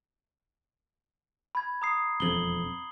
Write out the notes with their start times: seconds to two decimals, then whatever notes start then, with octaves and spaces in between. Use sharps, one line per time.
1.55 B5 G#6
1.82 A#5 D#6 C7
2.20 E1 F2 F#7 G7